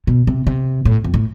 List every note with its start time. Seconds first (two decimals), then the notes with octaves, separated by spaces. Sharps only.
0.07 B2
0.27 C3
0.47 C3
0.85 A2
1.04 F2
1.14 A2